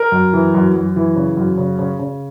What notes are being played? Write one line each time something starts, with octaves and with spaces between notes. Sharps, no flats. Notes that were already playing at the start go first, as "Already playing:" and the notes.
Already playing: A#4
F#2
E3
F#2
F#2
E3
C#3
F#2
C#3
C#3
C#3